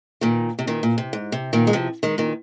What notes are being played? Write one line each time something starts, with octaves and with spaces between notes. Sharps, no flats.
A#2 D#3
C3
A#2 D#3
A#2
C3
G#2
C3
A#2 D#3
G#3
C3 F3
D#3 G#3
A#2 D#3